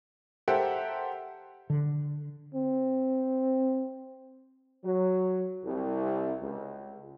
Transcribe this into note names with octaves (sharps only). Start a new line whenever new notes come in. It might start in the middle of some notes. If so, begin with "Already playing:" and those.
G4 A4 A#4 C5 E5 F#5
D3
C4
F#3
C2
C#2